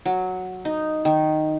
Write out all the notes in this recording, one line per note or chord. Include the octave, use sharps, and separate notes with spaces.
F#3
D#4
D#3